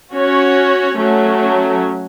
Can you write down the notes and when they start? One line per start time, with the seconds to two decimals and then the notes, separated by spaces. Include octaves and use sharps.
0.12 C#4 F#4 C#5
0.97 F#3 A3 C#4